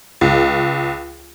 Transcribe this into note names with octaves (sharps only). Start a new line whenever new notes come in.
C#2